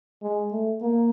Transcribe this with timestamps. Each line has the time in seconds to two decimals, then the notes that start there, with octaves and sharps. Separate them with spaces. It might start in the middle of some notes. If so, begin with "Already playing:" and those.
0.22 G#3
0.52 A3
0.82 A#3